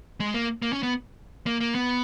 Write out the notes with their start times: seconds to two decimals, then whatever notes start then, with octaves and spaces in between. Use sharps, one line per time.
0.20 G#3
0.34 A#3
0.62 A#3
0.72 C#4
0.83 B3
1.46 A#3
1.60 A#3
1.75 B3